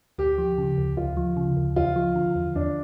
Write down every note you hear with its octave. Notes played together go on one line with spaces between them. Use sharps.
D2 G4
F3
C#3
D2
D2 F4
F3
C#3
D2
E2 F4
F3
D3
E2
E2 D4